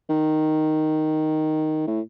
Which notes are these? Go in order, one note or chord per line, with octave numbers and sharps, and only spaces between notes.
D#3
A2